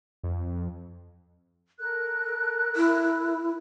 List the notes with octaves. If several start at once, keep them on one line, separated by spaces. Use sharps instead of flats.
F2
A4 A#4 F#6
E4